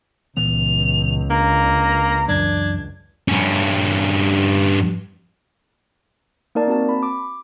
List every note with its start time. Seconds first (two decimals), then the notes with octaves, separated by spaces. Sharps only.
0.37 C#2 A#2 E3 B3 F7
1.30 A#3 D4 A#5
2.29 F#2 E3 F#3 D4 G#6
3.28 G2 C#4
6.55 A#3 D#4 A#4 D5 A5
6.67 C4 F#4 A5
6.89 B5
7.03 D6